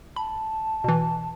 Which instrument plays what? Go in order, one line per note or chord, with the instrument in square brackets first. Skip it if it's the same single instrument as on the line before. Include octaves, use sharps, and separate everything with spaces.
[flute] A5 [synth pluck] B5
[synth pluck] B2 E3